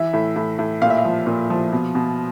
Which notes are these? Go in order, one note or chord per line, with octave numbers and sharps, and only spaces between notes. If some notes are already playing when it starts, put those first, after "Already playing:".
Already playing: E3 E5
A2
A2
A2
A#2 F5
E5
F5
F3
A#2
F3
B2
B2